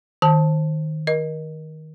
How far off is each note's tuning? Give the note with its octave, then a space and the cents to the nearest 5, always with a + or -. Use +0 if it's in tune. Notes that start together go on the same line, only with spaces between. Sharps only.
D#3 +0 A5 +0
A#4 +30 D#5 +0